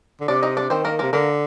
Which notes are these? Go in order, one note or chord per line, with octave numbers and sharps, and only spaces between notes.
D3
C3 D4 D5
D#4 D#5
D4 D5
D#3 C4 C5
A#3 A#4
C3 A#3 A#4
D3 A#3 A#4